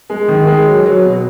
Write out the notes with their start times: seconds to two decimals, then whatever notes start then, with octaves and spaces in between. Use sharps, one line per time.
0.10 G#3
0.28 D#3
0.47 G#3
0.66 F#3
0.86 F#3
1.04 B2